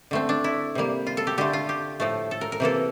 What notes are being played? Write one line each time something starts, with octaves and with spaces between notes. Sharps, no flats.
D3 A3 C4
D4
E4
C3 G3 A#3
F4
A4
G4
D3 A3 G4
F4
G4
A2 F3 A3
A4
A#4
A#4
C3 E3 A#3 A4